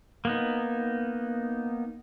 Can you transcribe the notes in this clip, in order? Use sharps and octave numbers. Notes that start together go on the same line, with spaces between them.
A#3 B3 D#4